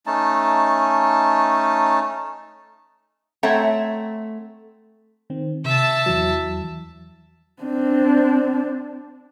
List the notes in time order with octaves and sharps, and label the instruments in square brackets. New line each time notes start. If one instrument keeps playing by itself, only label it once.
[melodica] A3 C#4 D#4 A5
[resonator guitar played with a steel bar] A3 C4 C#5 E5 F#5 A#5
[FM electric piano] D#3 C4
[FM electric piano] C3 [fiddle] E5 A5
[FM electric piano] E2 E3 F#3
[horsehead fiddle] C4 D4